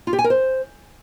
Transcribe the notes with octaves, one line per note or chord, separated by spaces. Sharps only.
F4
G4
G#5
A#4
C5